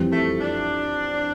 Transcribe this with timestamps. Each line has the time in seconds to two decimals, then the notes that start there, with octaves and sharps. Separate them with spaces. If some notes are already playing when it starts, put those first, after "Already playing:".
Already playing: F2 E3 G3 C4 G4
0.11 A3
0.40 D4